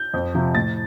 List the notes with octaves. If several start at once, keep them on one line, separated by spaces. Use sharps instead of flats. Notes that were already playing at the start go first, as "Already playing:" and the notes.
Already playing: G6
F2
C3 F3
A2 A6